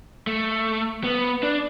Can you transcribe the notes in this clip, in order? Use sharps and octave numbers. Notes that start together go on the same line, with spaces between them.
A3
B3
D4